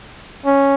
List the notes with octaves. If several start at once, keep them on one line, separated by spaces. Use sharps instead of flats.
C#4